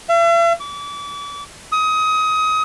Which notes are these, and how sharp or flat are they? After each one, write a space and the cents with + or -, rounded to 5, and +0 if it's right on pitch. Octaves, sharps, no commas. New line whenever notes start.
E5 +45
D6 -35
D#6 +25